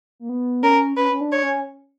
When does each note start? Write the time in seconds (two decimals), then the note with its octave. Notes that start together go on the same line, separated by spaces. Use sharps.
0.20 A#3
0.29 B3
0.63 C#4 A#4
0.97 C#4 B4
1.12 C#4
1.21 D4
1.32 C#5
1.43 C#4